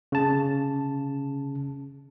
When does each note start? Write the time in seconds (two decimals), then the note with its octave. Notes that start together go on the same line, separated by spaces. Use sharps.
0.12 C#3 A5